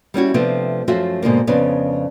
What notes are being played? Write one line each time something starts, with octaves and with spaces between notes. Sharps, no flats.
G3 C#4 E4 F#4
C3 F3 A3 B3 C4 D4
F#2 F3 A3 F4 F#4 E5
G#2 B2 D3 A#3
F2 C#3 B3 D4